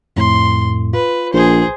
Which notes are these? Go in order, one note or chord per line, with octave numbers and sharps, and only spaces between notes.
F2 A2 C6
F4 B4
A#1 G#4 C5